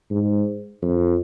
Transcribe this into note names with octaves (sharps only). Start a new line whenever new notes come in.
G#2
F2